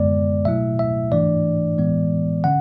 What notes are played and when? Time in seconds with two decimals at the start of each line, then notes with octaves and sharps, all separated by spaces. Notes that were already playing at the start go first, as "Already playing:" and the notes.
Already playing: F#2 D3 G#3 B3 D5
0.45 B2 F#3 A3 E4 E5
0.79 E5
1.12 G#2 E3 A3 D4 D5
1.78 A2 E3 G#3 B3
2.44 D3 C#4 F#5